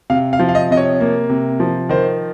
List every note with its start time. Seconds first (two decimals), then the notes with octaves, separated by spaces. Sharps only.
0.10 C3 F5
0.33 F5
0.39 F3
0.49 F5
0.55 D#5
0.70 C3 D#5
0.77 C#5
1.01 A#3
1.29 C3
1.60 F3
1.89 D#3 C5